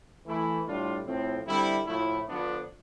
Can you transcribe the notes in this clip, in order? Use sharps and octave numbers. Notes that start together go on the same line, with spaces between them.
E3 A3 E4
A2 G3 D4 F4
A2 F3 C4
D3 G3 C4 E4
A2 F3 A3 E4
D3 F3 B3 D4